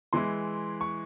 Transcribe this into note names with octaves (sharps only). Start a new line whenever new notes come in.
E3 G#3 E4 C6
C#6